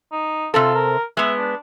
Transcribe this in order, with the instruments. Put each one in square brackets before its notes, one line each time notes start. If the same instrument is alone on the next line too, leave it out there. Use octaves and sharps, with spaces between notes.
[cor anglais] D#4
[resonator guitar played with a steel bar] C3 C4 A4 [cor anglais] F4
[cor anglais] A#4
[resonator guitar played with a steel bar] G#3 B3 [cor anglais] E5
[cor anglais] D4